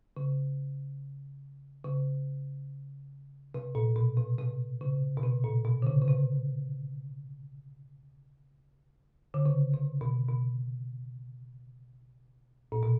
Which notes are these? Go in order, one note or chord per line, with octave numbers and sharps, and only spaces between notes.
C#3
C#3
C3
A#2
B2
C3
C3
C#3
B2
C3
A#2
B2
D3
C#3
C#3
C3
D3
C#3
C3
B2
B2
A#2
B2